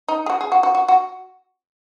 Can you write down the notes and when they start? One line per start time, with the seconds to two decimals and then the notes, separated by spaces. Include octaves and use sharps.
0.08 D#4
0.26 G#4
0.30 F#4
0.41 G#4
0.52 F#4
0.63 F#4
0.75 F#4
0.88 F#4